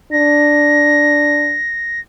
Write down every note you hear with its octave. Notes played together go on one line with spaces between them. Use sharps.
D4 A#6